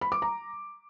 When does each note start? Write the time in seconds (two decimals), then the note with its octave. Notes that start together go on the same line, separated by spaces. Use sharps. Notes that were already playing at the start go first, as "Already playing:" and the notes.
0.01 B5
0.12 D6
0.22 A#5